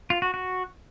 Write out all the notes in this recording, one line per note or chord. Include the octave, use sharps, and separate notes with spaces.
F4
F#4
F#4